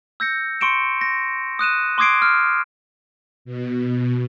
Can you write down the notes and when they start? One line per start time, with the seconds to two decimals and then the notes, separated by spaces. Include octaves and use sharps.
0.20 E6 G6 A#6 C#7
0.61 C6 C#6 C#7 D7 E7
1.01 A#6
1.59 D#6 F#6 D#7 E7
1.98 C6 D6 D#6 G#6 C7 D7
2.22 F6
3.45 B2